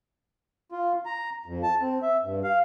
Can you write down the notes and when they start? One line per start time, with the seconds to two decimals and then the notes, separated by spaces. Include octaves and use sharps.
0.72 F4
1.06 A#5
1.46 F2
1.63 A5
1.81 C4
2.02 E5
2.23 G2
2.44 F5